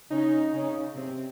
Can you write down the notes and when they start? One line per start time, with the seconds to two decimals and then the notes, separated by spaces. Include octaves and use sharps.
0.10 C#3 C#4 D#4
0.53 C#3 C#4
0.96 C3 C4